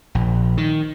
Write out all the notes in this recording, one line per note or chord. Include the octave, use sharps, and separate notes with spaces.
A#1
D#3